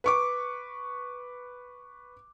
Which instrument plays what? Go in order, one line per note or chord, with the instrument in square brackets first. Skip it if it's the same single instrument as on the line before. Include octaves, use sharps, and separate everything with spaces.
[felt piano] B4 C#6 D6